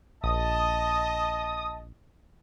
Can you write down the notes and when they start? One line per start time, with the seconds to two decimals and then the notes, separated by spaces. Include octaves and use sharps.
0.24 A#1 D#5 A5 D#6